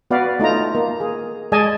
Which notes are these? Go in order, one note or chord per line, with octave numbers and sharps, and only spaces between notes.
B3 F#4 B4 D5 F5
A3 D#4 F4 A#5
A#3
G#4
G#3 G#4 D5 D#5 G#5 A5